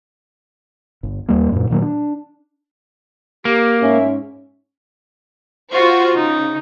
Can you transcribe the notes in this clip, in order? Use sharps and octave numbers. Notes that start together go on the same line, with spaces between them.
G1
D#2 G3 A#3
F#2 A#2
A#2 D#3 F#3 A#3
D4
A#3 G4
G#2 C#4 E5
F4 F#4 C5 C#6
C#3 D#4